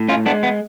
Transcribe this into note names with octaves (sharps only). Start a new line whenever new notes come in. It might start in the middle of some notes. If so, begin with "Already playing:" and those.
Already playing: A2
C#4 F4
G#3 B3 D4
B3